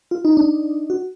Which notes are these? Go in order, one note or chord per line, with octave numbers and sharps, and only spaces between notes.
F4
D#4
D4
F#4